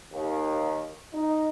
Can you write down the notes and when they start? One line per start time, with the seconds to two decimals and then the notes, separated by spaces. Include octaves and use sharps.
0.12 D#2
1.13 D#4